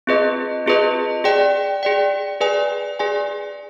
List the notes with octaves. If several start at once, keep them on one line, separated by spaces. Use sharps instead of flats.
C4 F4 G#4 B4 D#5
C4 F4 G#4 B4 D#5
G#4 D5 G5
G#4 D5 G5
G#4 B4 D5 G#5
G#4 B4 D5 G#5